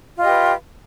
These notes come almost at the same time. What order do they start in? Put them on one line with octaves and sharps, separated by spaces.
F4 D#5 G4 B4